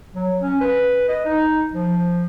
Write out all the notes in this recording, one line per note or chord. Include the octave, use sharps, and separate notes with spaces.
F#3
C#4
B4
D#5
D#4
F3